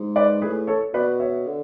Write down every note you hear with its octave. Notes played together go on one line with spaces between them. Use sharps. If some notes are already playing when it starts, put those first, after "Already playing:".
Already playing: G#2
B4 D5
A2 G#4 B4
A4 C#5
B2 B4 D5
C#5 E5
D3